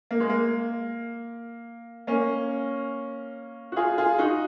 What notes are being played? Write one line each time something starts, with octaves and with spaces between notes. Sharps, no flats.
A#3
G#3
A#3
A#3 C#4
F#4
F4 G#4
F4 G#4
D#4 F#4